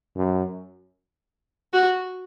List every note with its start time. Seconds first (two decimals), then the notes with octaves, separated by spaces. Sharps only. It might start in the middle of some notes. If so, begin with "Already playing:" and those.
0.16 F#2
1.73 F#4